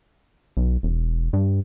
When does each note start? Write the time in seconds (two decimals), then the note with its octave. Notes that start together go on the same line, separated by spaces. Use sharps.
0.57 B1
0.83 E1
1.33 G2